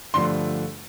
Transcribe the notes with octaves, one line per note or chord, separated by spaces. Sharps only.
G2 D3 F3 A3 C6